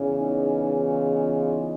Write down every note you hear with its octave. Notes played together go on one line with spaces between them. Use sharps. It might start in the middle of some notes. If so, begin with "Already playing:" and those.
Already playing: E2 C#3 E3
C#4 D#4
D#4 F4